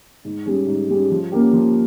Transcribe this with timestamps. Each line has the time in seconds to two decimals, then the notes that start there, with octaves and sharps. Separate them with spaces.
0.25 G#2
0.46 G3 C#4 G#4
0.67 G#2
0.89 G3 C#4 G#4
1.10 F3
1.32 A#3 C#4 G4
1.53 F3